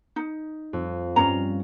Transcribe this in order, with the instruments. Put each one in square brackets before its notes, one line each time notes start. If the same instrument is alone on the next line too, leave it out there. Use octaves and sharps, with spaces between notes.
[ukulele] D#4
[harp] F2
[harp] G2 [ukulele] C#4 F5 A#5